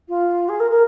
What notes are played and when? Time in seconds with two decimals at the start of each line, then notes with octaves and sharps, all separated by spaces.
0.08 F4
0.49 G#4
0.60 A#4
0.71 A#4